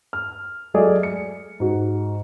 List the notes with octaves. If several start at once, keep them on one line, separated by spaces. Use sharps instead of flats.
F6
F#3 G#3 A3 G#4 D5 D#5
C#7
G#2 F#4